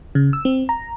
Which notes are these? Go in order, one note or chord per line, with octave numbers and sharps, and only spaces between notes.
C#3
E6
C4
A#5